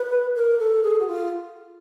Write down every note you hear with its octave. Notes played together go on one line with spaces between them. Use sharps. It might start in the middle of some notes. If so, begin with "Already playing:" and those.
Already playing: B4
A#4
A4
G#4
F#4
F4